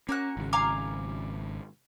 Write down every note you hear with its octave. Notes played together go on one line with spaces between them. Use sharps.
A#3 C#4 F#4 F#6
G#1 C#3
F5 G#5 A#5 D6